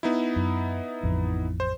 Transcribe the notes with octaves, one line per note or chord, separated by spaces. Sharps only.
B3 D#4 E4
F#2
A1 F2
C5